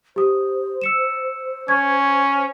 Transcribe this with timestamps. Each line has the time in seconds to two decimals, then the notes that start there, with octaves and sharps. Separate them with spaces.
0.16 G4 C5 D#6
0.82 E6 C#7 E7
1.68 C#4 C#6 G#6